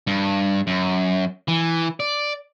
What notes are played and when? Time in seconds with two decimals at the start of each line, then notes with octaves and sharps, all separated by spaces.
0.07 G2
0.67 F#2
1.48 E3
2.00 D5